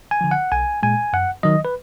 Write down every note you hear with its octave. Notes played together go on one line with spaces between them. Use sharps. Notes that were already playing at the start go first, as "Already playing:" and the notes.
G#5
D3 F3
F#5
B1 G#5
A#2 G#3 G#5
F#2 F#5
D#3 F#3 D#5
B4